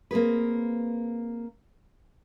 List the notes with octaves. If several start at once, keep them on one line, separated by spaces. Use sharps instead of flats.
A#3 C4 G#4 B4